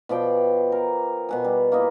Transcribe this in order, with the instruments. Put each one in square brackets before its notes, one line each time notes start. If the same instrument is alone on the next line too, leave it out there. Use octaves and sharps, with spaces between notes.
[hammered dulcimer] B2 F3 D5 G5
A#4
B2 F#5 G#5
G3
A#3 E4 D#5